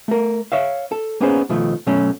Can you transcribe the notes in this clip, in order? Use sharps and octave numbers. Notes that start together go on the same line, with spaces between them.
A3 A#4
C#5 E5 F5
A4
A#3 B3 C#4 D#4 G#4 C5
B2 D#3 F3 A3
B2 F#3 A3 C#4